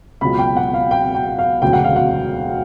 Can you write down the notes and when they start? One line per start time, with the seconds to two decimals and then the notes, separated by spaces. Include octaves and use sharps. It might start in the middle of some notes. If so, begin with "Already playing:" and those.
0.21 C#2 B2 F#3 B5
0.39 G5
0.56 F#5
0.74 F5
0.91 G5
1.14 G5
1.39 F5
1.62 E1 D2 C#3 F#3 G5
1.73 F#5
1.84 F5
1.96 F#5